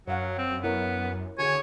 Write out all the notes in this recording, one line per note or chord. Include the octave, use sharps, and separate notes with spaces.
F#2 F#3 C#5 F5 F#5
C4
B3 E4 A#4 C#5
D3 F#4 G#4 C#5 G#5